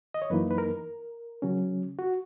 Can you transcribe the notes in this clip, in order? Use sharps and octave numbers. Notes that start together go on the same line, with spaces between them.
D#5
C#5
F#2 E3 A#3 D#4 B4
B4
A#4
C#3 F#3 C#4
F#4